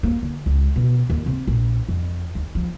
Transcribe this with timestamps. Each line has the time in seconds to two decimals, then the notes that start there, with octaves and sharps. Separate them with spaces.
0.03 A#3
0.22 D3
0.46 C#2
0.76 B2
1.10 D#2
1.26 C3
1.47 A#1
1.88 F2
2.35 D#2
2.55 F3